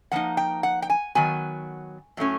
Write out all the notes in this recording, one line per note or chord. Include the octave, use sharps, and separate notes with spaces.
F3 A#3 D#4 F#5
G5
F#5
G5
G#5
D#3 F#3 B3 G#5
A2 F#3 A3 C#4